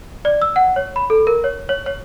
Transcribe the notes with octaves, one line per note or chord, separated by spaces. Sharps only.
D5
E6
F#5
C#5
B5
A4
A#4
C#5
C#5
C#5